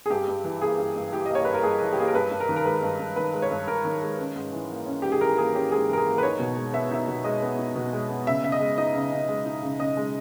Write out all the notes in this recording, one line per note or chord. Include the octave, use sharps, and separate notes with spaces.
G#4
G2 G4
G2
E3
A#3 G#4
G2
G2
E3 G4
A#3 D#5
C#5
G2 B4
A#4
G2 G#4
E3
G4
A#3 G#4
A#4
G2 B4
G2
A#4
D#3
A#4
G#3 B4
G2
G2
D#3 B4
G#3
C#5
G2
G2 A#4
D#3
G#3
C#4
G#2
E3
A#3
C#4
G#2 G4
G#4
E3 A#4
A#3 G#4
C#4 G4
G#2 G#4
E3 A#4
G#4
A#3
B4
D#4 C#5
B2
G#3
B3 E5
D#4 E5
B2
G#3 D#5
B3
D#4
B2
G#3
B3
C#3 E5
C#3 E5
D#5
G#3
D#4 D#5
C#3
C#3
G#3
D#4
C#3
C#3 D#5
G#3